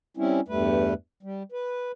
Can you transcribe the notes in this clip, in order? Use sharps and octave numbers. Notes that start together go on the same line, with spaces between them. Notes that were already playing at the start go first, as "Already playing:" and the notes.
G3 C4 C#4 E4
E2 G2 G3 A3 B4
G3
B4